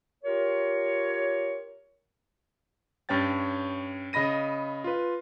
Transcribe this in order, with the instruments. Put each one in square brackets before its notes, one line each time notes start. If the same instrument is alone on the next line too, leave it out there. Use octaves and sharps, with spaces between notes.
[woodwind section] F4 G4 A#4 C#5
[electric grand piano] G2 C#4 C#5 G5 A6
C#3 D#5 B5 A#6 D#7
F4 B4